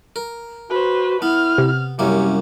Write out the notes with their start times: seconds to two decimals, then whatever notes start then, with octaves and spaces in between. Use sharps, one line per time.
0.16 A#4
0.70 F#4 B4 C5
1.22 B3 E4 F6
1.58 C3
1.99 C2 F#2 A#3 C#4 G4